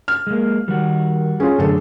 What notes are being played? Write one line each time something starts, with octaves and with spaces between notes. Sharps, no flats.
F6
G#3 A#3
D#3 G3 F#4
C#4 F4 G#4
F#2 D3 A3 D4 A4